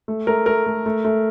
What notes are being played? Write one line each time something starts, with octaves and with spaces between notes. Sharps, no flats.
A3
A3 A#4
A3 A#4
A3
A3
A3